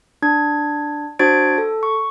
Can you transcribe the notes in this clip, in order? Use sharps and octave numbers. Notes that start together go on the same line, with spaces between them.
D4 G#6
D4 F#4 C5 G#6 A6 D7
A4
C#6